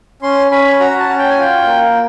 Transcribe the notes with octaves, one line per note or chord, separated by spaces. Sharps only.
C#4 C6
C#4 B5
F#4 A#5
A5
C#4
G5
G#5
F4 G5
A#3